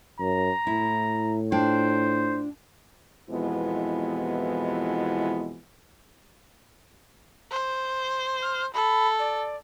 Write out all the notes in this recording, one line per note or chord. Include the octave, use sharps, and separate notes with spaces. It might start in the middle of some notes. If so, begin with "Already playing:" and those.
F#2 A#5
A2 E4
D4 F4 C5 G5
F2 B2 E3 G#3 B3 E4
C5
F6
A4 B5
D5